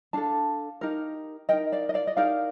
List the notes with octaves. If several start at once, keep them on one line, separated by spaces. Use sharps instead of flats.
D4 A4 F5 A5
D#4 G4 A#4
D#4 A#4 D#5 G5
D5 F5
D#5
D5 F5
D#5
D#4 G4 A#4 D5 F5